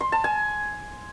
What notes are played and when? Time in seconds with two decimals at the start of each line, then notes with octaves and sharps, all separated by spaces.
0.01 C6
0.12 A5
0.24 G#5